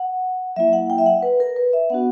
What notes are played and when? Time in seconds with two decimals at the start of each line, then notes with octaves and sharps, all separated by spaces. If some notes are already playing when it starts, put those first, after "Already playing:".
Already playing: F#5
0.56 F#3 A#3 E4 E5
0.73 F#5
0.90 G5
0.98 E5
1.06 F#5
1.22 B4
1.40 A#4
1.56 B4
1.73 E5
1.90 B3 D4 F#4 F#5